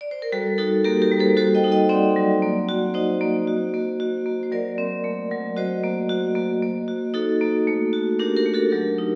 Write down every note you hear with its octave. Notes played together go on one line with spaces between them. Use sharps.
D5
C5
A#4
G3 F#4 A4
D#4 F#4 A4
A#3 G4 A#4
G4 A#4
G3
A4 C5
F#4 A4 C5
D#5 G5
D#4
D#5 G5
C4 D5 F#5
F#3
A#3
F#4
D#4 C5 D#5
A#3
F#4
A#3
F#4
A#3
C5
F#3 A#4 D5
C4
A3
F#3
F#4 C5 D#5
A#3
F#4
A#3
A#3
F#4
D#4 F#4 A4
A#3
A3
F#4
D4 G4 A#4
G4 A#4
A3
F#4 A4
F#3 G4 A#4
D#4